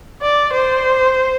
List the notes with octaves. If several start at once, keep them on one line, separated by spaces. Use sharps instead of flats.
D5
C5